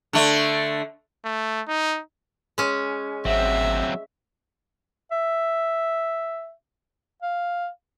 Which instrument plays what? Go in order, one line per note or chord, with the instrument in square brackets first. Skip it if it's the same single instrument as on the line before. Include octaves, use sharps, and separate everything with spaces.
[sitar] D3 A3
[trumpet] A3
D#4
[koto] G#3 C#4
[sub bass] G#1 [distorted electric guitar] F#3 C4 [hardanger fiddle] E5
[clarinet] E5
F5